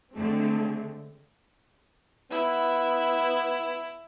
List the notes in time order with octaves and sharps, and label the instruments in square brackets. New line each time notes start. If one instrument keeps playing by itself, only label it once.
[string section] D3 G#3 A3 C4
[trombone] B3 [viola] E4